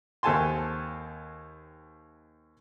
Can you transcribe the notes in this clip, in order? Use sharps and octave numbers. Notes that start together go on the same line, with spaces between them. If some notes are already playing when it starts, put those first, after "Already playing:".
D#2 C4 A4 G#5 A5 C6